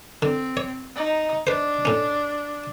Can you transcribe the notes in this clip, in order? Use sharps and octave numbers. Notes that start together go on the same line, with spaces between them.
D3 C4
C#5
D#4
D4 B4 C5
A2 C#4